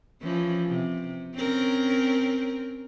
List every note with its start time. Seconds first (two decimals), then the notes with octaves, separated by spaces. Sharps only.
0.21 E3 F3 C#4
0.68 C3
1.34 C4 C#4 A#4